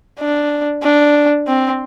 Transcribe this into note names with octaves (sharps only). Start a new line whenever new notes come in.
D4
D4
C4